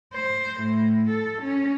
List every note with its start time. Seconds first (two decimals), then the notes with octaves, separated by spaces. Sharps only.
0.13 C5
0.61 A2
1.09 A4
1.41 C#4